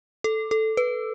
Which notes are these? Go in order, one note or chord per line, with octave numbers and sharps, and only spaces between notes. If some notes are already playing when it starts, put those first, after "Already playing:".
A4
A4
B4